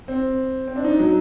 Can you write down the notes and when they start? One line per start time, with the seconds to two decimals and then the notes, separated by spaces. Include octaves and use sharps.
0.08 C4
0.68 C4
0.76 D4
0.84 D#4
0.99 F#3